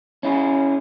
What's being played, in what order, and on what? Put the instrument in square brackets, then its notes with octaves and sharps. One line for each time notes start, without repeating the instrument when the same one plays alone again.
[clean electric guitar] C#4 E4 G#4